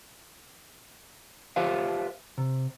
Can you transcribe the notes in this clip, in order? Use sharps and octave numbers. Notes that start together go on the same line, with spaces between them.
F4 G4 B4 C5 E5 F5
C3